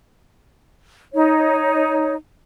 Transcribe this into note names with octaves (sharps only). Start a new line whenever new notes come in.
D#4 C#5